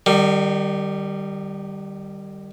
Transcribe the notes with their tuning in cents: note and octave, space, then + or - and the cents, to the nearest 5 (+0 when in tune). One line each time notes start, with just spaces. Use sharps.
D#3 -35 G3 +0